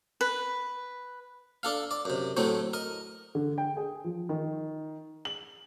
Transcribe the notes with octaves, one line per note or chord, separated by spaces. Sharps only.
B4
D4 A4 F5
D5
F#2 C3
A2 F#3 A3 C4
A#4 D#5
D3
G5
G#4
F3
D#3
F#7